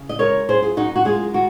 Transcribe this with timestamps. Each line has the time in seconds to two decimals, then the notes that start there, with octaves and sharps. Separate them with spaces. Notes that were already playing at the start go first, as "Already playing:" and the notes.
Already playing: C#3
0.09 D#5
0.19 G#3 A#4 C#5
0.49 F#2 G#4 C5
0.62 F4 G#4
0.77 F#2 D#4 F#4
0.96 F#4
1.05 G#3 F4 G#4
1.34 D#3 F#4